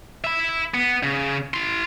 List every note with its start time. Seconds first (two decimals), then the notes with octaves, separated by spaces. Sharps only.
0.24 E5 B5
0.74 B3
1.03 C#3
1.54 E4 C6